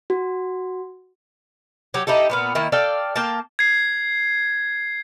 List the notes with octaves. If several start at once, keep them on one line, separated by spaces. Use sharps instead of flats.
F#4
F#3 G4
D#4 E4 G4 A4
A#2 B3 F5
D#3 A#3 E4
A4 D5 F5 G5
A#3 F5 G5 A5
G#6 C7